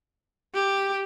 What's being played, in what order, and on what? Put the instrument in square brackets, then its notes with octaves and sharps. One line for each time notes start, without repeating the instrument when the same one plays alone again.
[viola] G4